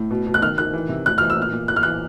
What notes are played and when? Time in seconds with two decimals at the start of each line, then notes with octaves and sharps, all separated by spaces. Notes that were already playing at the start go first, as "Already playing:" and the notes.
Already playing: A2
0.10 B2
0.27 B2
0.34 F#6
0.42 D#3 F6
0.58 D#3 F#6
0.73 E3
0.89 C3
1.05 A2 F#6
1.18 E3 F6
1.30 E6
1.37 A#2 F6
1.53 A#2
1.68 E3 F#6
1.76 F6
1.83 E3 F#6